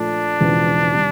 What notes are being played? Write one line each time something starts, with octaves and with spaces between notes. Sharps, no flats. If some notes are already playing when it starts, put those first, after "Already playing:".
Already playing: A#2 F3 A3 D4
E1 E2 C#3 F3 G#3
C3 D#3 G3